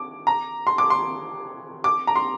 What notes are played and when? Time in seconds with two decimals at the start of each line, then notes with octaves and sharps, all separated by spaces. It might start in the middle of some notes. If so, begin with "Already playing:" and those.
Already playing: D6
0.27 A#5
0.67 C6
0.78 D6
0.90 C6
1.84 D6
2.07 A#5
2.16 C6